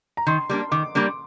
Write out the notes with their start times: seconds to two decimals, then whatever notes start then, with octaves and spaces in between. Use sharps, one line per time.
0.17 A#5
0.27 D#3 C6
0.50 G3 A#3 D4
0.72 D#3 D6
0.95 G3 A#3 D4